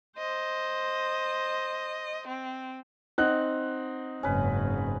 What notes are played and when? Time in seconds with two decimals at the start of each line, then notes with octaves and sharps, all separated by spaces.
0.18 C5 D#5
2.27 C4
3.18 C4 D#4 F#5 F#6
4.23 F#1 G#2 C#4 B4